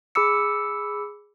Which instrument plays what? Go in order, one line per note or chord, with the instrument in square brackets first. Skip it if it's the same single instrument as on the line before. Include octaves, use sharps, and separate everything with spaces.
[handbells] G#4 B5 D6 E6 C#7